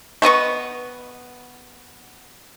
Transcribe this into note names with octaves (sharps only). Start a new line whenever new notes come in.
A3 B3 D#5 C#6